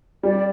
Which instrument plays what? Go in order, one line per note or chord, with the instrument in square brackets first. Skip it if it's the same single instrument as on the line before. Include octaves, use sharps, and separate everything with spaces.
[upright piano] G3 [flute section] D5